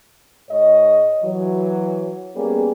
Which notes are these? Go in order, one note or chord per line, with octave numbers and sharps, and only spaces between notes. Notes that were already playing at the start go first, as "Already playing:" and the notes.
G#2 C#5 D#5
E3 F#3
G3 A#3 B3 C#4 G#4